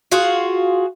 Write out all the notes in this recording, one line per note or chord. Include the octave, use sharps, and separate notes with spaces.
F4 F#4 G#4